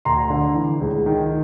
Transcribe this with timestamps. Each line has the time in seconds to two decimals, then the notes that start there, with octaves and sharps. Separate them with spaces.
0.05 D2 A#5 C6
0.30 D3
0.55 E3
0.81 C#2
1.06 D#3